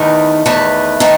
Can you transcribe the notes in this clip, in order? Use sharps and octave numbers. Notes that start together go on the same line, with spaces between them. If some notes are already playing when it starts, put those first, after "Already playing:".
Already playing: E2 D#3 A3 B4
E2 D#3 A3 B4
D#3 A3